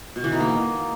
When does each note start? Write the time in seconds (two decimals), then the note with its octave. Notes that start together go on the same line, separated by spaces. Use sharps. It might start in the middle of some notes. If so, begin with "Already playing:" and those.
0.16 B2
0.24 E3
0.32 D#4
0.40 A#3